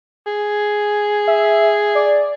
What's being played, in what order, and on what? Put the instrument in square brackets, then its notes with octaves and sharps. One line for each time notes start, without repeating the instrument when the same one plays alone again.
[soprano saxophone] G#4
[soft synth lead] E5
D5